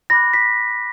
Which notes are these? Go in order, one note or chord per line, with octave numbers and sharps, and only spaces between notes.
B5 D6 F#6 A#6
B6